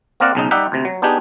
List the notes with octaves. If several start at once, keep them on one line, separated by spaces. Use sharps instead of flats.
A#3 C4 A#4 D5 F5 F#5
B1 C#3 D#4
G3 D#4 G4 E5 F#5
D2 C3
F#3
B3 D4 D#4 G4 G#4